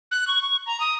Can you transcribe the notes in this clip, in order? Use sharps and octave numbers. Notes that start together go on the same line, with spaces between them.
F#6
C#6
C#6
A#5
D#6